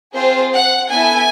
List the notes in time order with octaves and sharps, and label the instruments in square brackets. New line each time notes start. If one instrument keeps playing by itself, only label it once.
[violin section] C4 F4 G#4 C5
F#5
B3 E4 A4 G#5